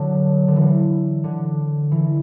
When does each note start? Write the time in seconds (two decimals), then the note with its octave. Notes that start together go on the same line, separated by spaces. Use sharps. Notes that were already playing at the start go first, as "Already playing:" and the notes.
Already playing: D3 F#3
0.48 D3
0.56 E3
1.24 D3
1.92 E3